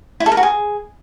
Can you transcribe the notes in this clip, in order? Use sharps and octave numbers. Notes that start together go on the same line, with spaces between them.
E4
A4
A#4
F#4
G#4